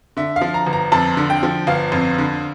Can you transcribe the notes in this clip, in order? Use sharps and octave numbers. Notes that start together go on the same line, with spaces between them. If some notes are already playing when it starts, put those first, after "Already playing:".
D3 E5
F5
F3
A#5
G1
A#5
F2 A5
D3
G5
F3
G1 F5
F2
D3